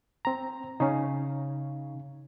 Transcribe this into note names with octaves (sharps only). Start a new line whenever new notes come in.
C4 A#5
C#3 C#4 D#4